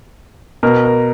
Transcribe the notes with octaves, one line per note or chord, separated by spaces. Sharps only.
B2 A#4
A#4